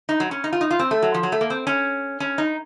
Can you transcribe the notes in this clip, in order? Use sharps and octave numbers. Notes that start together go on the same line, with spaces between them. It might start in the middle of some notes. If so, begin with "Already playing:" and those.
D#4
F#3
C#4
D#4
F4
D#4
F4
C4
A3
F#3
F3
F#3
A3
A#3
C4
C#4
C#4
D#4